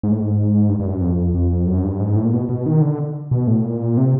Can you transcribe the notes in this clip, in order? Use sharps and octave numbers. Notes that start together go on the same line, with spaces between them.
G#2
A2
G#2
G2
G2
F#2
F2
F2
F#2
G2
G#2
A2
A#2
B2
B2
D#3
D3
B2
A2
A#2
C3